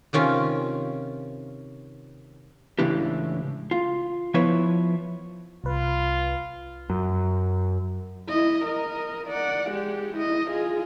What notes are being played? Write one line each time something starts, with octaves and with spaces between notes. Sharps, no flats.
C3 D#3 C#4 F4
C#2 A2 C#3 E3 D4 G4
F4
F3 B3 E4 B4 C#5
C2 F4 B4
F#2
E4 D#5
A#4 D#5
D5 F#5
G#3 G4
E4 D#5
F4 G#4